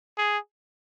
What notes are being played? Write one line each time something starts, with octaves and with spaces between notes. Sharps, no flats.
G#4